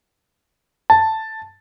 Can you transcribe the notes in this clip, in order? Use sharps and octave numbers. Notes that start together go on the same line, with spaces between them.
A5